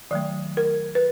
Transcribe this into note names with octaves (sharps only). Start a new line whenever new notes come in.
D#3 F#3 A3 D5
A#4
B4